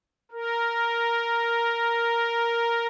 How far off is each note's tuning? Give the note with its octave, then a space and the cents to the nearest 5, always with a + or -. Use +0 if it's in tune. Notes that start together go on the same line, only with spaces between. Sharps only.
A#4 +0